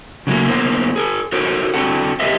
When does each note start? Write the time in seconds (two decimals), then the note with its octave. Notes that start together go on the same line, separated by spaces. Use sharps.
0.27 C#3 F#3 A3 A#3
0.48 A#3 B3 F4 A#4 C5
0.96 G#4 A#4
1.32 F#4 A4 A#4 C5 C#5
1.74 C4 D4 F#4 A4 F#5
2.20 G4 G#4 A#4 C5 D#5 E5